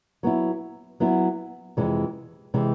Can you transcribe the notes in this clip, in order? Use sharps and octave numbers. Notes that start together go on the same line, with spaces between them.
F#3 B3 E4
F#3 B3 E4
F2 C3 E3 G#3
C3 E3 G#3